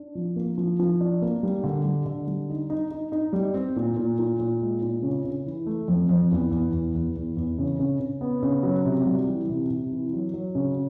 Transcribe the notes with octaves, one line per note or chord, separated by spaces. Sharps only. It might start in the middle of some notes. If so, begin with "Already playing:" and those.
Already playing: D4
F3
A#3
F3
F3
D4
A#3
G3
D3
G3
D3
G3
D#4
D#4
D#4
D#4
G3
C4
A#2
A#2
A#2
A#2
G#3
A#2
C#3
C#3
E3
A3
F2
F2
E2
E2
E2
E2
E2
E2
C#3
C#3
C#3
B3
C#3
F#3
C3
G3
E3
C3
C3
E3
F#3
F#3
C#3